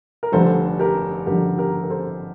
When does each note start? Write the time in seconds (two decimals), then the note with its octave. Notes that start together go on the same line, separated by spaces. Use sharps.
0.23 A#4
0.32 F1 F2 D3 G3 A4 C5
0.79 G4 A#4
1.27 F1 F2 D3 G3 G4 A#4
1.58 G4 A#4
1.84 A#4
1.90 A4 C5